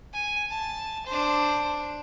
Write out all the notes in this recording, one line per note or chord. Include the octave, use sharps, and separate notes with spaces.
G#5
A5
D4 C5